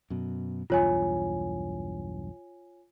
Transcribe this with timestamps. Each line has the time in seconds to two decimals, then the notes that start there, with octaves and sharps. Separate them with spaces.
0.10 F#2 B2
0.70 B1 E2 G2 F4 C#5 G#5